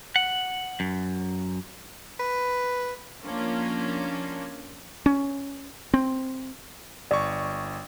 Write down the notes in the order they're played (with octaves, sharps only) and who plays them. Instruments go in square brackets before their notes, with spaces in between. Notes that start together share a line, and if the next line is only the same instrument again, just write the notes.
[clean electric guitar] F#5
F#2
[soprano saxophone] B4
[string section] F3 A#3 C#4 D4 F4
[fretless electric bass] C#4
C4
[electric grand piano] G1 C#6 [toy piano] D5